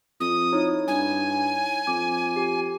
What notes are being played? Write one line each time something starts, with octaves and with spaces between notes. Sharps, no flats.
F2 D#6
D#4 E4 C#5
G2 G#5
F2 D6
G4